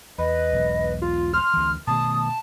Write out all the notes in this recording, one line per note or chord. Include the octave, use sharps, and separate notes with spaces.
E2 B4 D#5
E1 B1
F4
C6 F6
D2 E3
B2 D#3 A3 A5 D#6